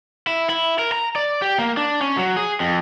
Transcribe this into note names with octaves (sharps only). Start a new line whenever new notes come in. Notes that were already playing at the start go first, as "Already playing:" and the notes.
E4
E4
A#4
A#5
D5
G4
A#3
D4
C#4
F#3
G#4
F2